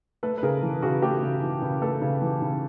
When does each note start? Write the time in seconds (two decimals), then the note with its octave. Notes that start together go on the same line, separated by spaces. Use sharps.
0.23 A3 A4 B4
0.38 B4
0.42 C#3 G#4 A#4
0.63 E3
0.82 C#3 F#4 G#4
1.02 A3 G4 A4
1.22 C#3
1.42 E3
1.62 C#3
1.82 A3 A4 B4
2.02 C#3
2.22 E3
2.42 C#3